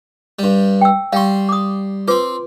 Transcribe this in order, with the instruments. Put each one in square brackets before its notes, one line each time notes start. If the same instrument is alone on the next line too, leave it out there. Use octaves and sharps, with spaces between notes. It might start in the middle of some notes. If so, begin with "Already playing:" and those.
[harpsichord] G2 G3
[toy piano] G5 E6
[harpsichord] G3 C6 [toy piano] F5 G5 C#6
[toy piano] D6 D#6
[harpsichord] C4 C5 [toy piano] F4 B4 D6